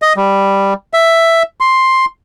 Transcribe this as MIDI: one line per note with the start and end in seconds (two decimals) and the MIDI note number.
0.02 0.13 75
0.17 0.74 55
0.94 1.43 76
1.60 2.05 84